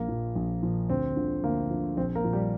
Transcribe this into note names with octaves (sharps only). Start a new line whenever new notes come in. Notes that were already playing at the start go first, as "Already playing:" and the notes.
Already playing: A#1 A#3
A#2 F3
A#1
A#2 F3
D2 C4
D3 F3
D2 A#3
D3 F3
A#1 C4
A#3 A#4
A#2 F3
G3 G4